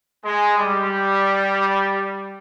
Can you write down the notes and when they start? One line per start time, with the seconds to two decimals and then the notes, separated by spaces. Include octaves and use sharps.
0.25 G#3
0.59 G3